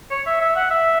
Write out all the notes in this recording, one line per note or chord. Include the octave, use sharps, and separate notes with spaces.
C#5
E5
E5
F#5
E5